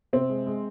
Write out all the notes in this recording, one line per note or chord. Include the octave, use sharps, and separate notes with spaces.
C3 C4
G#3
G#3